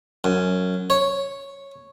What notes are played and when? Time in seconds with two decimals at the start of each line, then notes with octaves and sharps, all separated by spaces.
0.24 F#2
0.90 C#5